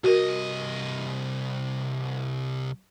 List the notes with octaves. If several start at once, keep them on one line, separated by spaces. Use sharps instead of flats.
C2 F#4 A#4 D#5